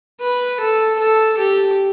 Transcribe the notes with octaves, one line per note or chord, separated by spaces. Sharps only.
B4
A4
A4
G4